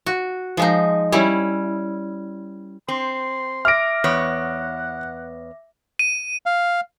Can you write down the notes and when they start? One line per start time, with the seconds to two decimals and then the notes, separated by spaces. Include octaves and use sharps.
0.06 F#4
0.57 F3 G#3 D#4
1.12 G3 C#4 E4
2.88 C4 C6
3.65 E5 D6 F6 A#6 D7
4.04 E2 B3 C#5 F#5
5.99 D#7
6.46 F5